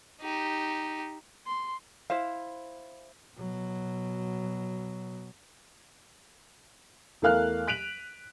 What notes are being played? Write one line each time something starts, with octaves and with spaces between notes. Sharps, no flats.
D#4 G4
C6
E4 C5 F5
B2 F#3
E2 A3 A#4 F5 F6 F#6
F#6 B6 D7 D#7 F7 F#7